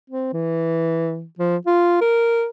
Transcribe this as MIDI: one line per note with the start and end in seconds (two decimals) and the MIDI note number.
0.10 0.29 60
0.33 1.25 52
1.39 1.57 53
1.66 1.99 65
2.01 2.47 70